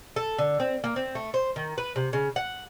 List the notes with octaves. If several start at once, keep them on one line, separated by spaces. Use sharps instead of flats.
A4
D3
C4
A#3
C4
A3
C5
D#3
B4
C3
C#3
F#5